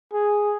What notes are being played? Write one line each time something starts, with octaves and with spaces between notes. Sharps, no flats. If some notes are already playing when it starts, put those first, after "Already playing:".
G#4